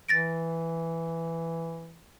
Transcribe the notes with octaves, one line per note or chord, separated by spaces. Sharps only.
E3 A6 A#6 D7